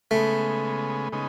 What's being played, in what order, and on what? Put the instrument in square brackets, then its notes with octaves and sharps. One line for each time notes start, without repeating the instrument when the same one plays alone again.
[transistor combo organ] C#3 G#3 B3 [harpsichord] A3
[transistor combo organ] C#3 G#3 B3 D#4